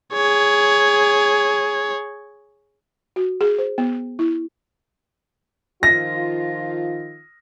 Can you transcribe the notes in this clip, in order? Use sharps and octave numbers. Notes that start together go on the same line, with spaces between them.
G#4 C#5
F#4
G#4
C5
B3
E4
D#3 F3 F4 A#6